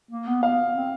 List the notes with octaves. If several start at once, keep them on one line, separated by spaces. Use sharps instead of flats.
A#3
B3
B3 F5
C4